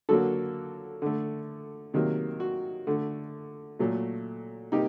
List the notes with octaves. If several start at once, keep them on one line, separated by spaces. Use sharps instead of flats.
D3 F#3 A#3 F#4 A4
D3 A3
C3 D#3 F#3 A#3
F#4
D3 A3
A#2 F#3 A3
C3 G3 A#3 D#4 G4